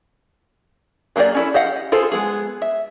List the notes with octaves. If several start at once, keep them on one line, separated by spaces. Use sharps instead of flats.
F#3 A#3 G4 G#4 D5
C#4 E4 A4
G4 D#5 F5 F#5
F4 G#4 A4 C5
G#3 B3 G#4
E5